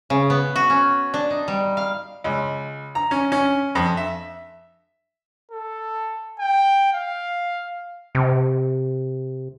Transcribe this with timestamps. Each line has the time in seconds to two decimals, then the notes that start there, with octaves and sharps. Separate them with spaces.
0.10 C#3
0.30 B3
0.56 F#4
0.70 C#4
1.14 D4
1.30 D#4
1.48 G3
1.77 F5
2.24 C#2
2.95 A#5
3.11 C#4
3.32 C#4
3.75 F2
3.97 E5
5.52 A4
6.39 G5
6.93 F5
8.15 C3